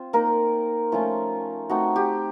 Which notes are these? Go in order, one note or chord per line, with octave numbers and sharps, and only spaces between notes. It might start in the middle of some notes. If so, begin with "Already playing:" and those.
Already playing: C4 F4
A#3 D#4 A#4
F3 A3 C#4 F4
A3 C4 D#4 F#4
G4